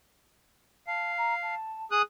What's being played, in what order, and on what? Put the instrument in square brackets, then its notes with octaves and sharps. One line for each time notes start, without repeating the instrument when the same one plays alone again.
[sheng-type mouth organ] F5 [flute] A5
[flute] A#5
A5
[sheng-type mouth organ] G#4 D#6 F#6